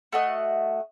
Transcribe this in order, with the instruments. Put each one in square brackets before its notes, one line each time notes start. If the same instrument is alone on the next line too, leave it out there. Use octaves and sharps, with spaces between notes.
[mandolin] A3 F#4 D#5